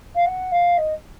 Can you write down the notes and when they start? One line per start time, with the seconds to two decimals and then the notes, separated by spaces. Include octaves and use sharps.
0.15 F5
0.25 F#5
0.51 F5
0.77 D#5